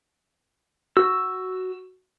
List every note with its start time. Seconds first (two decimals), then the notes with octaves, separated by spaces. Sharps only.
0.97 F#4 E6